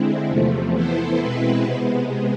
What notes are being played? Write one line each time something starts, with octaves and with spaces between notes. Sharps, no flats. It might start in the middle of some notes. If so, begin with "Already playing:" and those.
Already playing: D3 G#3 C4 E4
E2 C3 F3 A3
E3 B3 E4 A4 C5
B2 G#3 C4 E4 B4
C3 G#3 B3